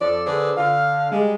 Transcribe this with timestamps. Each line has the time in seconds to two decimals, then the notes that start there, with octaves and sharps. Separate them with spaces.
0.01 F2 F3 A4 D5
0.27 D3 G#4 B4 C5 D5
0.57 D3 F5
1.12 G3 G#3